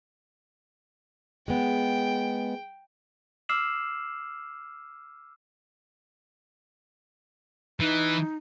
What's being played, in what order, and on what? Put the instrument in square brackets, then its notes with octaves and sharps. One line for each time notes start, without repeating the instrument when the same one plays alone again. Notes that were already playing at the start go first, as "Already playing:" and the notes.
[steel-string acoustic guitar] G#3 B3 [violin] G5
[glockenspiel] D6 E6 F6 C7 E7 F#7
[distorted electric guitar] E3 [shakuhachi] D#4